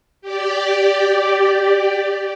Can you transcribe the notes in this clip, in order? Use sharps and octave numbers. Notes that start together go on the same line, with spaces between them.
G4 D5